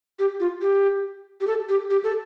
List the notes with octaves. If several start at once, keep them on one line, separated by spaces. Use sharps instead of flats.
G4
F4
G4
G4
A4
G4
G4
A4